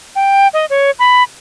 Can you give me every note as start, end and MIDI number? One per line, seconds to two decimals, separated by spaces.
0.15 0.48 79
0.54 0.66 75
0.70 0.91 73
0.99 1.23 83